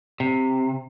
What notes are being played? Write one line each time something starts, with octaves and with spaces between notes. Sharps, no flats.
C3